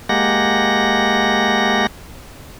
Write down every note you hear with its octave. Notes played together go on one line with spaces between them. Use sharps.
G#3 A#3 G4 F#5 A#6